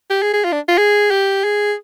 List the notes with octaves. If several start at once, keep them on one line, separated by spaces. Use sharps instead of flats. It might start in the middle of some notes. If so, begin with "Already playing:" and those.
G4
G#4
G#4
F4
D4
F4
G#4
G4
G#4